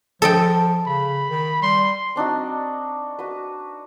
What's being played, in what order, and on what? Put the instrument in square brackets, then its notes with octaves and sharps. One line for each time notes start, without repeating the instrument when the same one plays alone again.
[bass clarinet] F3 [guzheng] A4 D#5 G5
[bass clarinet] C#3 [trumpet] B5
[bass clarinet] D#3
[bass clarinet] G3 [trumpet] C6
[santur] C4 D4 D#4 F#4
F#4 B4